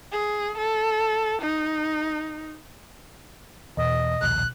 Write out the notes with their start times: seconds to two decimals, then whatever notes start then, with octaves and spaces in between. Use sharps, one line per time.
0.12 G#4
0.58 A4
1.42 D#4
3.77 E2 B2 D#5
4.22 A#1 D#2 F#6